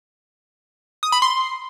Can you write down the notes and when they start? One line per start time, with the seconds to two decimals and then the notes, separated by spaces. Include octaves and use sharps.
1.03 D#6
1.12 B5
1.22 C6